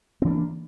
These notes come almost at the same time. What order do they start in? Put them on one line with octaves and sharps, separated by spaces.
C4 E3 D4 A#3